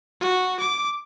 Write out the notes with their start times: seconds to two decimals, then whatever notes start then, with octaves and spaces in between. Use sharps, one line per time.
0.21 F#4
0.60 D6